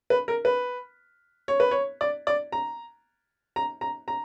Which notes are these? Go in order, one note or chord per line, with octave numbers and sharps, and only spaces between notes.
B4
A#4
B4
C#5
B4
C#5
D5
D5
A#5
A#5
A#5
A#5